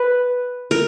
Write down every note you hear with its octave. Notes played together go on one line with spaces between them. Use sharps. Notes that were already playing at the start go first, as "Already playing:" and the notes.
Already playing: B4
A#4